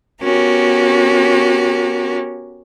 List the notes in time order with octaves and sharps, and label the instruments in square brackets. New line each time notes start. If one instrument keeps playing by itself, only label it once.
[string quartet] B3 C#4 F#4 G4 A#4